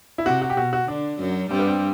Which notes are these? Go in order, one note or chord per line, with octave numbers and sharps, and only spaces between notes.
E4
C3 F#4
F#4
G4
B2 F#4
F#4
D3 D4
F#2 F#3
G2 G3 C4
B3
C4